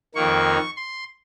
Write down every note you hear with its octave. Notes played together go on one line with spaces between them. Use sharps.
F2 D#3 A#3 C#6
C6